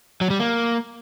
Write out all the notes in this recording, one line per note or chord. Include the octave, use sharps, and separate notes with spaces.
F#3
G3
A#3